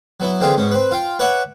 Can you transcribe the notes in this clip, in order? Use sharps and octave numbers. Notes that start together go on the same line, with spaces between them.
F#3 B3 E4
D3 E3 C4 F4 G4 G#4
G#2 B2 C#4
C4 B4
F4 F5 G5
B4 C#5 D5 E5 F#5 G#5